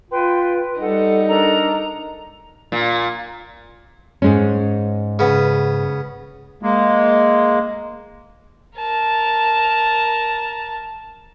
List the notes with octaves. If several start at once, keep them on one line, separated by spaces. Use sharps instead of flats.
F4 B4 G5 C6
G3 D#4 A4 F#5
D4 A4 A#4 A#5
A#2
G#2 G#3 C#4
C#3 B3
G#3 A#3
A#4 A5